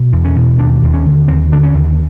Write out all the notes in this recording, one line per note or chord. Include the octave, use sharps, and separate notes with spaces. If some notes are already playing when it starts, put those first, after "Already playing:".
Already playing: B2
E2
C#4
B2
D#2 D4
D#2
C#4
D3
D#2 C4
D3 D4
C#4
D#2